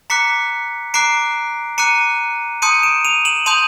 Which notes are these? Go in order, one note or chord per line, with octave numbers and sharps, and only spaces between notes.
A#5 D6 F#6 B6 C#7
A#5 D6 F#6 C7 D7
A#5 D6 F#6 C#7 D#7
A5 C6 D#6 G6 C#7 D#7
D7 E7
D#7 F7
E7 F#7
A5 C6 D#6 G6 D#7 F7